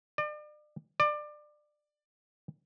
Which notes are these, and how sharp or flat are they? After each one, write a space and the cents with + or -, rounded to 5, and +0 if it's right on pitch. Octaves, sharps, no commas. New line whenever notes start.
D5 +40
D5 +25